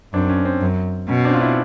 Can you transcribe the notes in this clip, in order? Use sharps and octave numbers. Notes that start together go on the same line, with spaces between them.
F#2 C4 D4
C#4
C4
F#2
B2 C#4
C4 D4
F4
D4 E4